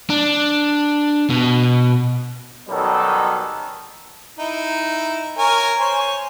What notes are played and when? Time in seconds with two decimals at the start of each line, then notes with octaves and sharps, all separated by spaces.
0.10 D4
1.30 B2
2.69 B2 D#3 F#3 G3 C#4 A4
4.39 D#4 E4
5.38 A#4 C#5 G#5
5.80 C5 C#5 G#5